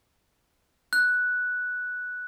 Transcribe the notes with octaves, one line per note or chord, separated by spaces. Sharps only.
F#6